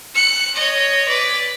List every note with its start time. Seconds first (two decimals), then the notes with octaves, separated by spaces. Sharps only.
0.15 F#6 C#7
0.55 C#5 D#5
1.08 B4 D5